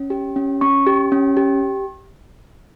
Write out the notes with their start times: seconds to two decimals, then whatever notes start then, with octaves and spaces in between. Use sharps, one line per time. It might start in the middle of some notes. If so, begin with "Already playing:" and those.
Already playing: C#4
0.10 G4
0.36 C#4
0.61 C#4 C#6
0.87 G4
1.12 C#4
1.37 G4